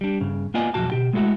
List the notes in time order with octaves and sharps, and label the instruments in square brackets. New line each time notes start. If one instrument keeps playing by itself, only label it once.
[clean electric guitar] G3 D4
G2 C#3
A#3 B3 F4 D5 D#5 G#5
B1 F2 A#2 D3 F#4 A5
B2 G4
G#3 A3 D#4 E4 F#4 A4